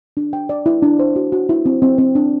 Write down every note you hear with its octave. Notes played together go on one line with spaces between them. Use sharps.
D4
G5
D5
E4
D4
C5
F#4
F#4
E4
C4
C4
C4
D4